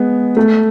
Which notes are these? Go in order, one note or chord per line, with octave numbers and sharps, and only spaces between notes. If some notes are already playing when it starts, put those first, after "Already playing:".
Already playing: G#3 B3
A3